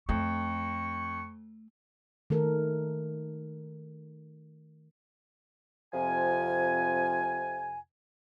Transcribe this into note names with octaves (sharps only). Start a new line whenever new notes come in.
F2 A3 C#6
D#3 A3 A4 A#4
F2 C3 F3 G#5